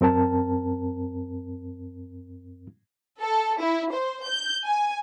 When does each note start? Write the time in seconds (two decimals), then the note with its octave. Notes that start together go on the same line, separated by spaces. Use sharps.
0.01 F#2 C4 A#4 A5
3.21 A4
3.60 E4
3.92 C5
4.27 G6
4.66 G#5